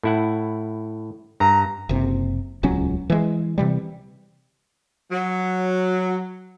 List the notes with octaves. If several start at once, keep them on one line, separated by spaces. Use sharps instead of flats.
A2 E4 F#5
G2 A#5
F#1 C3
D#1 C#2 F#3 C#4
E3 G#3
C3 E3 G3
F#3